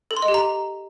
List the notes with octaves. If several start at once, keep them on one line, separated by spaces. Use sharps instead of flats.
A4
C6
D#5
G4
A#5